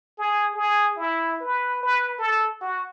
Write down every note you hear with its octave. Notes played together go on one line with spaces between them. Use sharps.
G#4
G#4
E4
B4
B4
A4
F#4